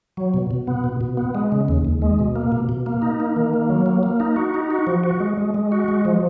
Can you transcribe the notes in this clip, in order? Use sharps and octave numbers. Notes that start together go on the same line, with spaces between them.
F#3
B2
B2
B3
B2
B2
B3
G#3
C#3
D#2
D#2
G#3
B2
A#3
B2
B2
A#3
D#4
A#3
D#3
A#3
F#3
A#3
A#3
D#4
F#4
D#4
F#4
F3
F#4
G#3
G#3
G#3
F#4
G#3
F3